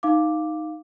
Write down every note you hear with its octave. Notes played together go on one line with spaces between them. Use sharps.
D#4 F5 D6